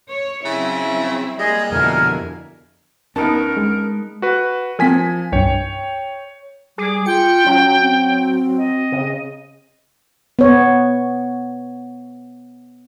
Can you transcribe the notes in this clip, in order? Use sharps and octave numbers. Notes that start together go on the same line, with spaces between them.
C#5
C#3 F#3 C4 E4
G3 G#3 A#3 G#4 D#5
F2 B2 D3 E4 A#4 G#5
D2 B3 C#4 D#4 A#4 A5
G#3
F#4 B4
F3 C4 A#4 G#5 B6
C2 G2 C#5 G5
G3 G#4 D6
F4 G5 C#7
F#3 C#4
C4
D#5
C#3
B3 C#5